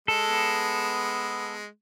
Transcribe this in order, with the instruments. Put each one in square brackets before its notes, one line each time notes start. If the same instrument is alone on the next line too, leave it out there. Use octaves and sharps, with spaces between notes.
[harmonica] G#3 [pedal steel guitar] A4
[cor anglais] B3